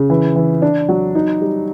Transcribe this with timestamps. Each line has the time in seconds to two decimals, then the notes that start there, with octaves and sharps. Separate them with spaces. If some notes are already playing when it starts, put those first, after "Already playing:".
Already playing: C#3
0.10 E3
0.36 E3
0.62 D4
0.89 F#3
1.15 D#4
1.41 G3